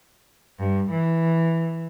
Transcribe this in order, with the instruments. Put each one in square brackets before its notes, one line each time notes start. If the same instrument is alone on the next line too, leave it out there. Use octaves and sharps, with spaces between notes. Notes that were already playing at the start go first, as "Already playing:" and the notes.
[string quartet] G2
E3